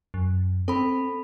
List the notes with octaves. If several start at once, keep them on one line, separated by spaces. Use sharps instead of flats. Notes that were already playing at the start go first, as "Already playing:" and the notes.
F#2
C4 A4 B5